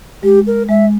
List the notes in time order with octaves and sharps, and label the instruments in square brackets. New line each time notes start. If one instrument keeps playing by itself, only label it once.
[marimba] G#3 [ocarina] G4
[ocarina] A#4
[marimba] G#3 [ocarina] E5